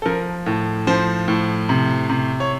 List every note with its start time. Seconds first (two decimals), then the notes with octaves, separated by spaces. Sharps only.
0.02 A4
0.06 F3 A#4
0.46 A2
0.87 F3 C5
1.28 A2
1.69 C3
2.09 C3
2.40 C#5